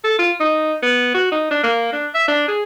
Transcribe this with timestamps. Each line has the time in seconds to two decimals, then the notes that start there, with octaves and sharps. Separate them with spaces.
0.04 A4
0.19 F4
0.40 D#4
0.82 B3
1.14 F#4
1.32 D#4
1.51 D4
1.63 A#3
1.93 D4
2.14 E5
2.28 D4
2.48 G#4